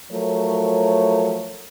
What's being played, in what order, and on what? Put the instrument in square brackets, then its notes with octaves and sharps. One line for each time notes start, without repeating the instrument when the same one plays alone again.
[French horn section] F3 F#3 A3 A#4 C#5